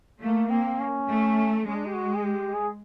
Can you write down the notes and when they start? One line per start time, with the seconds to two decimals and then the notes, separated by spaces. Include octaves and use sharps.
0.20 A3 A#3
0.49 A#3 C4
0.79 C#4
1.08 A3
1.67 G#3 C#4
1.76 D4
1.87 G4
1.96 F#4
2.16 G#4
2.25 G4
2.55 G#4